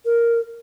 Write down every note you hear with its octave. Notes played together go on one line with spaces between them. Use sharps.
A#4